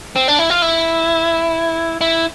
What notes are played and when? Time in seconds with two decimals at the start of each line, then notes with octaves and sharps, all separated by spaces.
0.16 C4
0.28 D4
0.39 E4
0.50 F4
0.62 E4
2.01 E4